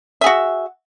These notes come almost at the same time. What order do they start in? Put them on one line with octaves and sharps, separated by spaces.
E5 G#4 F#4